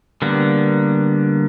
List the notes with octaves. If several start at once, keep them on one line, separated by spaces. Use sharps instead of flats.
D3 G3 A#3 B3